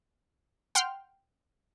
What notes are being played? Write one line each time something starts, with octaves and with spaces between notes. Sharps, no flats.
F#5 G5 C6 F6